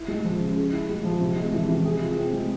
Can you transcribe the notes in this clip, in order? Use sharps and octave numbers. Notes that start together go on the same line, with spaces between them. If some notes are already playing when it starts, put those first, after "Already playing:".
Already playing: E4
G#3
F3
C#3
G#4
E4
G#3
F3
C3
G#3
E3
C3
G#4
F4
C4
G#3